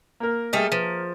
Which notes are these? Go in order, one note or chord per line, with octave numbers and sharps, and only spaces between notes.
A#3 A#4
G3 A3 G#4 D#5 E5 G#5
F3 B4